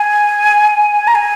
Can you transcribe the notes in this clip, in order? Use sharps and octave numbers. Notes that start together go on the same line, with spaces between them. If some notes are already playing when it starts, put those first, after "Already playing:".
Already playing: G#5
A#5
G#5